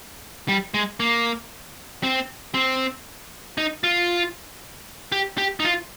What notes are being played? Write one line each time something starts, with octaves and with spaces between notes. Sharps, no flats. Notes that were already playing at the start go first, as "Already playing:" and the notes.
G3
G#3
A#3
C4
C4
D#4
F4
G4
G4
D#4
F4